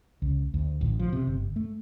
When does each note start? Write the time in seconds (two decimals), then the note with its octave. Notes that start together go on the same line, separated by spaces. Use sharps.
0.22 C#2
0.54 D2
0.81 A1
0.99 F3
1.13 C3
1.27 G1
1.56 A3